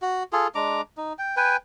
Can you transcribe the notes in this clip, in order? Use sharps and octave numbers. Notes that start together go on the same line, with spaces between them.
F#4
F4 G#4 A4
G#3 D4 A#5 D6
D#4
G5
B4 G5 G#5